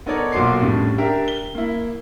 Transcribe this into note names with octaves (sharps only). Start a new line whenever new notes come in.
B3 D#4 A4 A#4 C#5 D5
B1 A#2 F#4 C6 D6 C7
F2 A2 G3 C#4 D4
D4 G4 A#4 E5
G7
A#3 E4